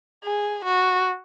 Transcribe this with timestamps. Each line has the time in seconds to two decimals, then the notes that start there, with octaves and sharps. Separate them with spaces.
0.24 G#4
0.64 F#4